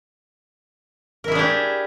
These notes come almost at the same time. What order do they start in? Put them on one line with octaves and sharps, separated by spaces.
A#4 E4 G#4 D4 G4